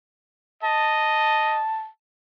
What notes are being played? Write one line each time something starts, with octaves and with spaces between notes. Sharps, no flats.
D#5 A5